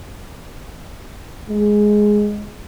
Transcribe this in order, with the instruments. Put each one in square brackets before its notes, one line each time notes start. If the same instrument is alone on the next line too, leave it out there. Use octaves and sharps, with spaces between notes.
[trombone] G#3